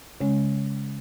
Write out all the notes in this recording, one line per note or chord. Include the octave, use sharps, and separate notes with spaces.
C#3 G#3 C#4